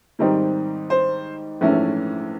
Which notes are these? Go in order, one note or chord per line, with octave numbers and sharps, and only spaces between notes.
G#2 D#3 G3 C4 D#4
C5
A#1 G#2 E3 A3 C#4